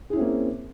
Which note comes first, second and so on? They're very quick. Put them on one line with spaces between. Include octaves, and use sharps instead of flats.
G#4 E4 C#4 C4 A#3